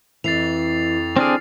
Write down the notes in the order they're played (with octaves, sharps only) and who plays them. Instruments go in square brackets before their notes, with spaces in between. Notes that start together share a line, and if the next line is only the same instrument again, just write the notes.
[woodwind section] F2 [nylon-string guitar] E3 [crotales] A6 C7 F7
[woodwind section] D3 D5 F6 [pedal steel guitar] C4 D4 G#4